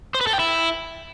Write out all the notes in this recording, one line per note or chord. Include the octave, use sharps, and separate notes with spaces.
C5
B4
A4
G5
E4